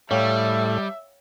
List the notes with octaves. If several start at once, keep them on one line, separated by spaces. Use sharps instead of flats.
A2 G3 C#5 E5 F5 G5